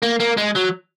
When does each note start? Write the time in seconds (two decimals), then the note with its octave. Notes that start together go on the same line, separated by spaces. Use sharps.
0.02 A#3
0.20 A#3
0.37 G#3
0.55 F#3